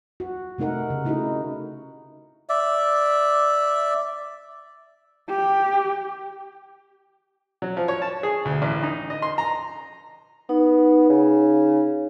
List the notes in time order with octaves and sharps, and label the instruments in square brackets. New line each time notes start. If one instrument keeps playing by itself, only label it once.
[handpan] F#4
C3 A3 D#4 A#4 F#5
C#3
C#3 A3 D#4 E4 F#4 A#4
[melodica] D5 E5
[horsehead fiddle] G4
[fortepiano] F#3
F3
C#5
A5
G#4
D2
A1
D#4
D#5
C6
A#5
[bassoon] B3 [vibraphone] D#4
[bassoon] C#3